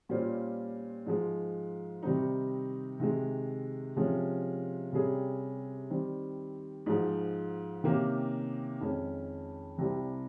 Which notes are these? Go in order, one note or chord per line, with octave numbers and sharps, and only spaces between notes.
A#2 G3 C#4 F4 C5
G#2 F3 G#3
C3 D#3 G3 C4 D#4
C3 D#3 G#3
C3 F3 G#3 C#4
C3 G3 C#4 G#4
D#3 G3 C4
G#2 F3 G#3 D#4
C3 D#3 A#3 C#4 G4
F2 D#3 G#3 C#4
C2 C3 G3 C4